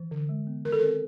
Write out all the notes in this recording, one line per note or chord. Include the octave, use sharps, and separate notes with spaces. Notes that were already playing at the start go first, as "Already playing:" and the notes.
Already playing: E3
D3
G#3
B3
D#3 A#4
A4
C4 A#4